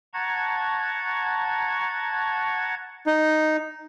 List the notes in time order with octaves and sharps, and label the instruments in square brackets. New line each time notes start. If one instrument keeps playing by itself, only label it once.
[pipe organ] F#5 A5 A#5 C#6 G#6
[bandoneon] D#4